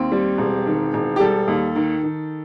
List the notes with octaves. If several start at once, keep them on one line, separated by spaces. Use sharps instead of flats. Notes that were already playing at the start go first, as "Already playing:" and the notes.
Already playing: D#2 C4
G3
E1
D#3
E1
G4
G3 A4
D#2
D#3
D#3